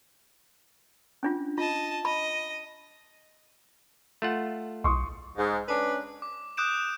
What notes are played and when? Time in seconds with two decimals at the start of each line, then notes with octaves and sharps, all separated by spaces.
1.23 C#4 D4 F4
1.58 F4 D#5 A5
2.05 D#5 B5
4.22 A3 F4 F#5
4.84 B1 C6 C#6 D#6
5.37 G#2
5.67 C#4 D4 B4
6.22 D6
6.57 D6 D#6 F#6 G6 D7 E7